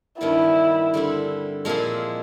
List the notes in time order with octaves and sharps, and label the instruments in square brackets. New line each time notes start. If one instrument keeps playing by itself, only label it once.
[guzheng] G2 D#3 G3 B3 [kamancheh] E4
[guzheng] D3 G3 C4 E4
A#2 F3 G#3 C4 E4